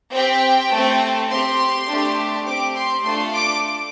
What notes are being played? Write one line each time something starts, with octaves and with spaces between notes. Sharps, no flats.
C4 G4 G5
A3 C4 A4
C4 G4 C6
A3 D4 G4
C4 G4 D6
C6
A3 D4 F4 A4 C6
D6